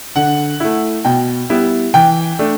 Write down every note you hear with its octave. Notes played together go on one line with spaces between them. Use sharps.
D3 F#5
A3 E4
B2 G5
G3 B3 E4
E3 G5
A3 D4